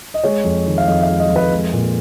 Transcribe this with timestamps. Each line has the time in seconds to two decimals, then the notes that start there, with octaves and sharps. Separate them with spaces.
0.14 D#5
0.24 G#3 C#5
0.44 F2
0.66 D#3
0.78 F5
0.87 F2 D#5
1.03 F5
1.09 G#3
1.20 D#5
1.30 F2
1.36 B4
1.51 G#3
1.73 A#2